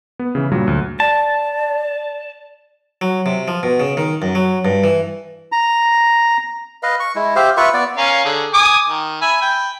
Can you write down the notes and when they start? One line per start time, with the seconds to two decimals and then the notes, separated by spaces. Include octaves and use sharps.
0.19 B3
0.35 C#3 E3
0.51 G2 A#2 F#3 G3
0.67 D2
1.00 D5 A5
3.01 F#3
3.26 C3
3.48 F3
3.63 B2
3.80 C#3
3.97 D#3
4.22 F#2
4.35 F#3
4.65 G2
4.84 E3
5.52 A#5
6.83 B4 D#5 F5
7.00 C#6
7.15 G#3 E4
7.36 G4 C5 E5 F5
7.57 F4 B4 E5 C#6
7.74 B3 D5
7.97 C#4 A#4 F5
8.25 D3 G#4
8.54 G#5 D6 D#6
8.89 D#3
9.21 E5 G#5 B5
9.42 G5 B5